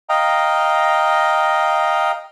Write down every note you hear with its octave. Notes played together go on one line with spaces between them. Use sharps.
D#5 F5 G5 A#5